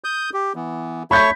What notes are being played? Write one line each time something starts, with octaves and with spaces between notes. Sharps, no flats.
D#6 G6
G4
E3 B3
A3 C#5 B5 C#6 G6 B6